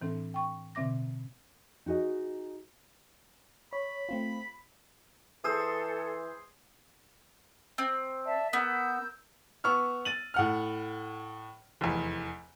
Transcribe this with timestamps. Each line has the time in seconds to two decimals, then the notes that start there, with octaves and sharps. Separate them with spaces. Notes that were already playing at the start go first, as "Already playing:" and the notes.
0.01 A2 E3 C4 D4 A4
0.34 G5 C#6
0.75 B2 D3 C4 E5 D6 A#6
1.86 D#4 F#4 G#4 D#5
3.73 C#5 B5
4.09 A3 C4 F4
5.44 E3 G#4 A4 C5 D#6 E6
7.78 C4
8.26 D5 E5 A5
8.53 B3 A#4 E6 G6
9.64 B3 C#6 E6 F6
10.05 A6 D#7 F#7
10.34 A2 F#5 F6
11.81 F1 E2